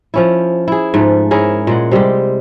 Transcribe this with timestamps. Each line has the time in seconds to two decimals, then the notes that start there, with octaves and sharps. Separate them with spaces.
0.14 F3 C#4 E4
0.68 E4 G#4
0.94 G#2 F3 A3
1.31 C#4 E4 G#4 A#4
1.67 A#2 G#3 F#5
1.91 C3 G3 G#3 G4